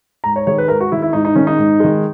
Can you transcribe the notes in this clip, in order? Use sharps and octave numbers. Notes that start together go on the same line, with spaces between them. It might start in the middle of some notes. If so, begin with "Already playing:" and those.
G#2 A#5
C#5
D#3 G#3 C#5
B4
G#2 A#4
F#4
D#3 G#3 E4
E4
G#2 D#4
D#4
D#3 G#3 C#4
D#4
G#2
D#3 G#3